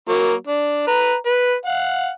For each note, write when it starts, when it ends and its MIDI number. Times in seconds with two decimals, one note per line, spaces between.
0.09 0.34 54
0.09 0.34 58
0.47 0.83 62
0.87 1.15 71
0.87 1.15 82
1.26 1.54 71
1.66 2.10 77
1.66 2.10 78